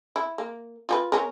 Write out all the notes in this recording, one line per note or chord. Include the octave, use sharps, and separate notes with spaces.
E4
A#3
F4 G4 B4
B3 C#4 A#4